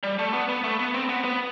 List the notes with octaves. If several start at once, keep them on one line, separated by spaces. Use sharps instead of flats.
G3
A3
B3
B3
A3
B3
C4
B3
B3